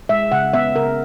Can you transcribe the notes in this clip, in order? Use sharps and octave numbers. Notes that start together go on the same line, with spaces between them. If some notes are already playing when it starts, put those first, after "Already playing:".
G#3 E5
C#3 F#5
B3 E5
C#3 A#4